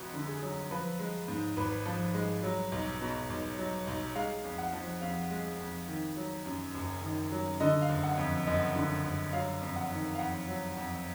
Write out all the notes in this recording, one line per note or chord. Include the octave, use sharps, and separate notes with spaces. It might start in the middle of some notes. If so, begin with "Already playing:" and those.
Already playing: F1 F2 F#4
D3
G#4
F#3
F3 B4
G#3
G#2
G#1 B4
F3
G#3
F#3
B1
B2
B1
F#3
B1
G#3 F5
F2
F#5
F3
F2 F5
G#3
F2
D#3
F#3
F#2
F#1
D#3
F#3
D3 D#5
F5
F#1
F#5
F2
F#1 D#5
D3
F#1
F#3 F5
F2
F#5
D#3
F5
F2 F#5
F#3
F2